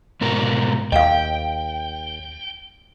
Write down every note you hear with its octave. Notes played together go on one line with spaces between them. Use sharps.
G#2 B2 A#4
D#2 D#5 F5 G5